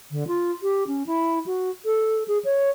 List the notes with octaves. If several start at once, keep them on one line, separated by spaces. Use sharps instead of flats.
D3
F4
G4
C#4
E4
F#4
A4
G#4
C#5